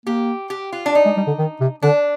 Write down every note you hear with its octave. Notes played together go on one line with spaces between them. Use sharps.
A#3 G4
G4
F4
D4
D#4
G#3
G3
D3
D#3
C3
D3 D4